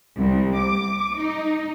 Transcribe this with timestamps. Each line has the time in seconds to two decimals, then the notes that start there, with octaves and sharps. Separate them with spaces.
0.16 C2
0.57 D6
1.17 D#4